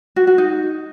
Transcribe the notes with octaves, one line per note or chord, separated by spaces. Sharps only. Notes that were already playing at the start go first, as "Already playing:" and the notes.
F#4
F#4
D#4